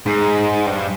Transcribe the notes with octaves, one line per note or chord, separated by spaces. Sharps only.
G#2
G2